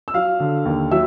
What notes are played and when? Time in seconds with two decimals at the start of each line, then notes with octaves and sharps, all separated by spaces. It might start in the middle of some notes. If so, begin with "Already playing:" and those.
0.08 E6
0.14 F#3 F5 F6
0.40 D3
0.65 D#2
0.91 F#3 E5 E6